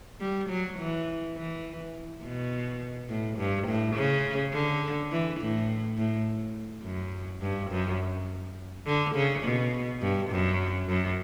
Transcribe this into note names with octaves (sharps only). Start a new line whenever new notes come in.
G3
F#3
E3
E3
B2
A2
G2
A2
C#3
D3
E3
A2
A2
F#2
G2
F#2
D3
C#3
B2
G2
F#2
F#2